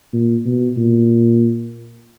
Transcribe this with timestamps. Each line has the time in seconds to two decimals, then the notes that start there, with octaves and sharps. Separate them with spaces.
0.13 A#2
0.45 B2
0.77 A#2